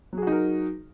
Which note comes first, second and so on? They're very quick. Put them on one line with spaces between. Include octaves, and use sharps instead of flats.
F#3 G#4 F#4 D#4 A#4